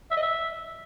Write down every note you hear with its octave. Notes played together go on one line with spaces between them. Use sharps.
E5
D#5
E5